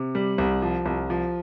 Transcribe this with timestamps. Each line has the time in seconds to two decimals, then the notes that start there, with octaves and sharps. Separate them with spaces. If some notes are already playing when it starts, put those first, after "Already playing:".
Already playing: C3
0.15 G3
0.38 C2
0.62 F3
0.86 C2
1.10 F3